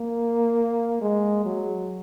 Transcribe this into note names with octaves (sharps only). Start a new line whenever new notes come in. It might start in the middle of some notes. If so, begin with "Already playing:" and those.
Already playing: A#3
G#3
F#3